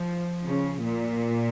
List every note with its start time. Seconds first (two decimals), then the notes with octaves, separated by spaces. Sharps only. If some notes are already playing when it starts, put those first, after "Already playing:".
Already playing: F3
0.46 C#3
0.83 A#2